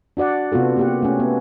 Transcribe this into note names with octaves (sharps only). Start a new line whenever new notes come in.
D4 F#4 D5 F#5
C3 B3 F4 F#4 A4
A#3 G4 F#5
A3 C#4
B3